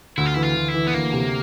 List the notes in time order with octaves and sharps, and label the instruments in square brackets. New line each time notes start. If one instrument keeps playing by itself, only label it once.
[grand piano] D2 [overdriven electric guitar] E4
[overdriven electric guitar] F4
[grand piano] E3 [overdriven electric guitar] E4
[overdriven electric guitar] F4
[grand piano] D2
[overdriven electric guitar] E4
[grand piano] E3
[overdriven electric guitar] B3
[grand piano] D2 [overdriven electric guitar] A#3
[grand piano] C3